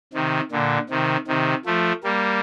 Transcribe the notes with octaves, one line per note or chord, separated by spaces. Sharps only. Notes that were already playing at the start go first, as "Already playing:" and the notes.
C3 D#3
A#2 D3
C3 D#3
C3 D#3
F3 A3
G3 A#3